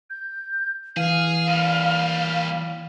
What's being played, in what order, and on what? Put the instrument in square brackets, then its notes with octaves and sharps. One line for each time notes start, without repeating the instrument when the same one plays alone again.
[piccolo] G6
[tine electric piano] E3 [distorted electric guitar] G#4 [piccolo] F5
[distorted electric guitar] D#2 G3